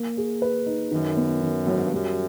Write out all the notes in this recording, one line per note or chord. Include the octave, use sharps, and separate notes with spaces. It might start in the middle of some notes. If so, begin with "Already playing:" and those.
Already playing: A#3
G#4
B4
D#4
F#2 D#3
B3
D#3
A2 F#3
G#2
G2
F#2 G3